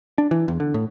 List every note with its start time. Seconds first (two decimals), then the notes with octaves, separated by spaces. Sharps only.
0.18 D4
0.31 E3
0.48 E2
0.60 D3
0.74 A2